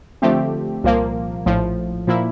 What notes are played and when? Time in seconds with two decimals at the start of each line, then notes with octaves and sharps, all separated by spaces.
0.22 D3 F3 A3 C4 G4
0.84 C2 A#2 F3 A#3
1.45 A#1 A2 F3
2.07 A#2 F3 A#3 E4